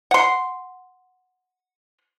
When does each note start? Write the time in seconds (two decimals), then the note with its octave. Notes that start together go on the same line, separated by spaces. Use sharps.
0.11 F#5 C6